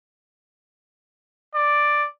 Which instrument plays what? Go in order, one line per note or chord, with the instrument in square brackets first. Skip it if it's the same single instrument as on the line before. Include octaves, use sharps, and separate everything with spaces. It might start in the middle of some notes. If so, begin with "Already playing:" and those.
[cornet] D5